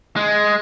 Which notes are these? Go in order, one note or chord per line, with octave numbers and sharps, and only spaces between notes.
G#3